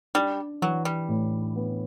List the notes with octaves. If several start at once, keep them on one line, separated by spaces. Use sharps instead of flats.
G3 D4
E3 F#3
G3
A2
B3